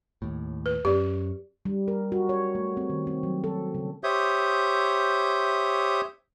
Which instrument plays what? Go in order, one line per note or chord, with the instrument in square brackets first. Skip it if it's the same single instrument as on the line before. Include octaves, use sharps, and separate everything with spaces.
[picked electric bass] D#2 A2
[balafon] B4
[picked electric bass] F#2 C4 C#4 [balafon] G4 D5
[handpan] G3
A#4
F#4
C#5
A3
C4
D#3
C4
F#3
A4
C#3
[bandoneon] G4 C5 C#5 E5 D#6 G6